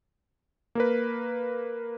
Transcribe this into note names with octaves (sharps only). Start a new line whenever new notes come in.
A#3 A#4 B4